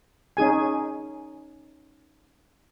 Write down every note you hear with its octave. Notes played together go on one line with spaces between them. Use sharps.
C#4 D#4 G#4 G#5